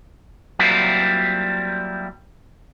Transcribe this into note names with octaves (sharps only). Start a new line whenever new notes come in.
F#3 G3 A#3 C4 E4 F4